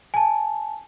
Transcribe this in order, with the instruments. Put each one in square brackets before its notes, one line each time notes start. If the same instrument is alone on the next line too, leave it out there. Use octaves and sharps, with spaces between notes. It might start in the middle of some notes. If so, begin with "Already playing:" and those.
[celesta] G#5 A5